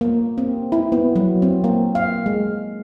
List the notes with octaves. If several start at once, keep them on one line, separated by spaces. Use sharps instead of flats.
A#3
C4
E4
B3
F#3
C4
A#3
F5
G#3